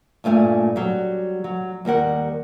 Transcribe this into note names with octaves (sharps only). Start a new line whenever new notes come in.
G2 A#2 A3 G#5
F#3 G3
F#3
D#2 G3 A#4 F#5